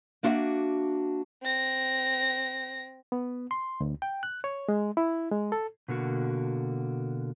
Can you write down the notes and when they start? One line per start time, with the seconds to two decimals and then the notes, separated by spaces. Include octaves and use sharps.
0.23 A#3 D4 E4 F#4 E5 F#5
1.42 C4 A#6
3.12 B3
3.51 C6
3.80 D2
4.02 G5
4.23 F#6
4.44 C#5
4.69 G#3
4.97 E4
5.31 G#3
5.52 A4
5.88 B2 D3 A#3 F#4